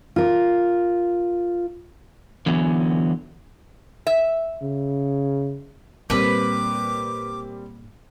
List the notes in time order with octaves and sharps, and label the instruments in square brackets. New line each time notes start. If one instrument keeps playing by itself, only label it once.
[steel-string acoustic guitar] F4 A#4
[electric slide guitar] D3 E3 F#3 B3
[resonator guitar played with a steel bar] E5
[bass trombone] C#3
[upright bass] A#2 [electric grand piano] G3 C4 A#4 [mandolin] B4 B5 [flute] D6